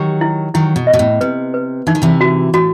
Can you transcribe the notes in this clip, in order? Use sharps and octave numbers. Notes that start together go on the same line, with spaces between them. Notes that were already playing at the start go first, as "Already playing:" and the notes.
Already playing: D#3 F#3 G4
E4
D#3 F#3 E4
B2
D#5
B2
A2
C3 B4
B4
E3 D#4
D#3
C3 E3
F#4
A2 F#4